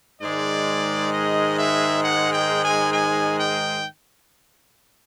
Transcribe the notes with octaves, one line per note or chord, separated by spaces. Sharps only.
G#2 D#3 G#3 D5
D#5
E5
F#5
G5
G#5
G#5
G5